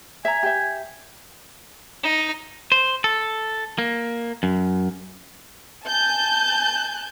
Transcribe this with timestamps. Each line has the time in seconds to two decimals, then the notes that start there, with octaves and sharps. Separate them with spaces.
0.25 E5 G#5 A#5
0.43 G4 E5
2.03 D#4
2.72 C5
3.04 A4
3.78 A#3
4.43 F#2
5.85 G#5 A5 G6